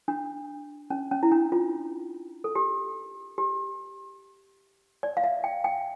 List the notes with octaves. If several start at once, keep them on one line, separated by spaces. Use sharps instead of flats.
D4
C#4
C#4
E4
D4
F4
A4
G4
G4
D5
F5
E5
G5
G5